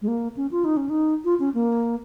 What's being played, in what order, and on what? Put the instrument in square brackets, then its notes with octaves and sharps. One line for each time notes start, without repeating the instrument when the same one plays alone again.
[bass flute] G#3
A#3
C#4
F4
D#4
C#4
D#4
F4
C#4
A#3